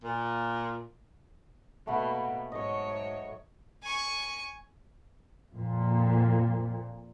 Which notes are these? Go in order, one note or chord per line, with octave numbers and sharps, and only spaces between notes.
A#2
B2 A3 A#3 F#5 B5
G#2 F#3 C#5 D#5 C#6
G#5 C#6
F2 A#2